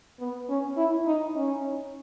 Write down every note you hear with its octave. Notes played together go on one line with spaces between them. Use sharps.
B3
C#4
E4
D#4
C#4